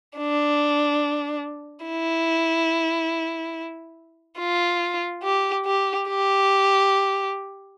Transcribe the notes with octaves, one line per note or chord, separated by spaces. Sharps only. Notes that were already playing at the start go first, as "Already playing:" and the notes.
D4
E4
F4
G4
G4
G4